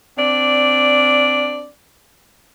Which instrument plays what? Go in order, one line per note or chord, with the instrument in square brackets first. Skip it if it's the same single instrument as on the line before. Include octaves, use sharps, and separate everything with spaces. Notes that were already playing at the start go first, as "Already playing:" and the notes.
[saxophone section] C4 D4 D5